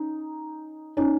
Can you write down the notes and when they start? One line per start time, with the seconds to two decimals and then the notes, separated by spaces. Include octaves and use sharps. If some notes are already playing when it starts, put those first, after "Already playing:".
Already playing: C#4 D#4
0.97 C#4 D#4